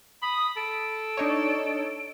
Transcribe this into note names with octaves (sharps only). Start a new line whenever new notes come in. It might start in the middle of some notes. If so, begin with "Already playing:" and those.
B5 D#6
A4 D7
D4 D#4 C#5